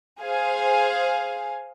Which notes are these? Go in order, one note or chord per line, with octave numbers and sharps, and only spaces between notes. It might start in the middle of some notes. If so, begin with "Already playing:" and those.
G#4 C5 F5 G#5